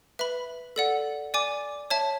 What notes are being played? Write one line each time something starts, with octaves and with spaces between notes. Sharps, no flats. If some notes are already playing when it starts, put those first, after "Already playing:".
B4 E5 B5
A4 D5 F#5
D5 G#5 D6
C#5 E5 A5